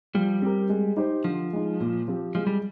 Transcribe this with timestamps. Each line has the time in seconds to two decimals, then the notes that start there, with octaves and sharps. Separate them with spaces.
0.14 F3 G3
0.42 C4 G4 A#4
0.69 G#3
0.97 D#4 G4 C5
1.24 D3 F3
1.53 G#3 D#4
1.80 A#2
2.08 F3 C4 G4
2.35 F3 G#3
2.47 G3